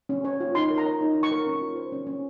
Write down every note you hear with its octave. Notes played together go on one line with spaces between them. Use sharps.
C#4
C#5
F4
D#4 C6
A#4
A#5
C#5
D#4
D#4
C#6
A#4
C#4
F4
C5
C#4
C#4